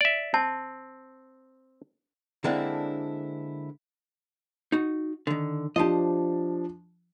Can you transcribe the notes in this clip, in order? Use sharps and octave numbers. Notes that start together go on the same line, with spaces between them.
D5 E5
C4 A5
D3 G#3 A#3 C4 D4 E4
D#4 F#4
D3 D#3
F3 D4 G4 C5 D#5